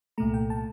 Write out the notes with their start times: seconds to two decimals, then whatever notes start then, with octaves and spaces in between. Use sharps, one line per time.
0.18 C2 A#2 A3 A#5
0.34 G5
0.50 A5